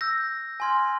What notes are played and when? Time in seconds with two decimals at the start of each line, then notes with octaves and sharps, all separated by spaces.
0.01 E6 G6 A#6
0.60 G#5 C6 F6 G#6